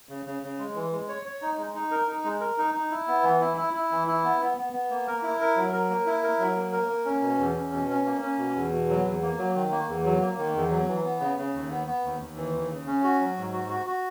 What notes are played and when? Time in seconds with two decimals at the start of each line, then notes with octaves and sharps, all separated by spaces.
0.09 C#3
0.26 C#3
0.43 C#3
0.59 G#3
0.75 E3
0.92 G#3
1.08 C#5
1.26 C#5
1.42 D#4
1.58 G#3
1.75 D#4
1.91 A#4
2.08 D#4
2.24 G#3
2.41 A#4
2.58 D#4
2.74 D#4
2.91 E4
3.08 B3
3.24 E3
3.41 E4
3.57 E4
3.74 E4
3.91 E3
4.07 E4
4.24 B3
4.40 B3
4.58 B3
4.73 B3
4.90 A#3
5.07 A#4
5.23 E4
5.40 A#4
5.56 F#3
5.73 A#4
5.90 A#3
6.06 E4
6.23 A#4
6.39 F#3
6.57 A#3
6.72 A#4
6.89 A#3
7.05 C#4
7.22 B2
7.39 E2
7.55 C#4
7.72 B2
7.89 C#4
8.06 A#3
8.21 C#4
8.38 B2
8.55 E2
8.71 B2
8.89 F#3
9.04 E2
9.22 A#3
9.38 F#3
9.55 D#3
9.72 A#3
9.89 E2
10.04 F#3
10.22 A#3
10.38 D#3
10.55 E2
10.70 F#3
10.88 E3
11.04 B3
11.20 C#3
11.37 C#3
11.54 D#2
11.71 B3
11.87 B3
12.04 D#2
12.21 D#2
12.36 E3
12.54 D#2
12.70 C#3
12.87 C#4
13.04 F#4
13.20 F#3
13.37 G#2
13.53 F#4
13.69 F#4
13.86 F#4